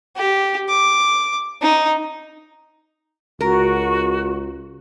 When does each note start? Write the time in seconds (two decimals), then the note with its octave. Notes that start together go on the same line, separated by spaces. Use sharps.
0.16 G4
0.69 D6
1.62 D#4
3.41 C#2 F#4 A#4